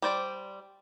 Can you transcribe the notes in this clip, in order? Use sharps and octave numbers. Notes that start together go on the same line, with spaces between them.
G3 C5 D5